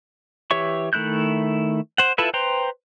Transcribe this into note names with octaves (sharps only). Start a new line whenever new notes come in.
E3 G4 C#5 E5 C#6
D#3 A3 E4 F#6 G6
C5 F#5
E4 F4 A4 B4 E5
B4 C5 G5 A#5 C6